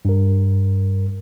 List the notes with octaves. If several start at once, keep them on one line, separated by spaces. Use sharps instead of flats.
G2 A#4